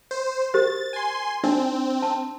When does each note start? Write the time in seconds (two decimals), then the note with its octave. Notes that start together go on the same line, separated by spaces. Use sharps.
0.11 C5
0.54 G4 A#4 C5 A6
0.93 G#5 C6
1.44 C4 D4 D#4 D5
2.02 A5